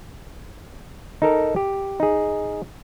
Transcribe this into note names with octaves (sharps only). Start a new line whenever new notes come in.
D#4 A4 A#4
G4
D#4 G#4